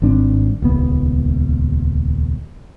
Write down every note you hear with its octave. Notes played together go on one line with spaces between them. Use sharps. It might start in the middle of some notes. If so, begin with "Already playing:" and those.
G#1 G2 C4 D4
D#1 C#2 B3